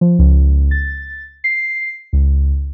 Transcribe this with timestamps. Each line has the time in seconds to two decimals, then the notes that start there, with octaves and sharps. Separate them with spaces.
0.01 F3
0.19 C#2
0.71 A6
1.44 C7
2.13 C#2